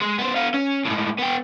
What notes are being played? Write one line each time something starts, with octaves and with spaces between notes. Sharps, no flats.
G#3
B3 C5
B3 F5
C#4
A2 G#3
B3 G5